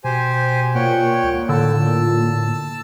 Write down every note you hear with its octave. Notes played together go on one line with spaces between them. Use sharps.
B2 G4 C5 G#5
A#2 C#5 F#5 G5
C#2
A2 D3 A5 E6